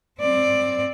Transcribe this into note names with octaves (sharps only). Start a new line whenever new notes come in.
C4 D5